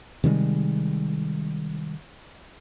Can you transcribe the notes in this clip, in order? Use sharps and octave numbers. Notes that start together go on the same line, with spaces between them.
C3 D#3 G3 G#3